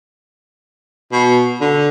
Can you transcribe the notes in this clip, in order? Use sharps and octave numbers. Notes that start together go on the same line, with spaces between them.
B2
D3